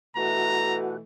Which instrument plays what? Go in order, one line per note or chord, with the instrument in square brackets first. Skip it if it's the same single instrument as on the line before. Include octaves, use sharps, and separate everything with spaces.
[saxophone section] B2 E3 A3 [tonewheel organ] F#4 [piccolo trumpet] A#5